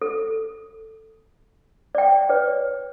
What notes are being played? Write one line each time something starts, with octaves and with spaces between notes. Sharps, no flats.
A4
D5 G5
B4 C#5 D5